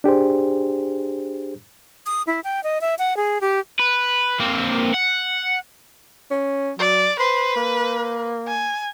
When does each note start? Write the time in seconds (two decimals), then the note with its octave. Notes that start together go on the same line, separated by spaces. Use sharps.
0.04 D4 G4 G#4 C5
2.06 D#6
2.27 E4
2.44 G5
2.64 D#5
2.81 E5
2.99 F#5
3.17 G#4
3.41 G4
3.79 B4
4.40 A#3 C4
4.94 F#5
6.31 C#4
6.79 F#3 D5
7.20 B4 C5
7.56 A#3
8.47 G#5